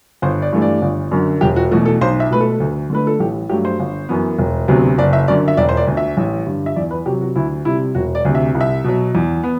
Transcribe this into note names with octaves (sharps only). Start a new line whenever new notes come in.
G1 C5
D5
G2 E3 A3
D5
G1
F#2 D3
E1 G4
F#4
E2 B2 A3 F#4
A4
B1 C5
E5
B2 A3 B4
A4
D2
D3 A3 B4
A4
A1 G4
G2 F#3 A3 G4
C5
G1
F#2 E3 B3
E1
D2 C3 F#3 B3
F#1 D5
E5
F#2 D3 D5
E5
E1 D5
C5
D5
D2 D3
E5
A1
G2 D3
E5
E2 D5
B4
C3 F#3 G4
F#4
D2 E4
C3 G3 E4
E1 F#4
D5
D2 C3
E5
C2
E5
B2 F#3
E2
B3